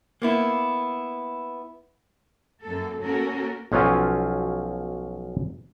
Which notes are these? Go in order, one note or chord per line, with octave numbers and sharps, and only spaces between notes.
A#3 B3 E4
F#2 A#3 A4
A#3 C#4 F#4 A4 A#4
B1 F3 F#3 C#4 F4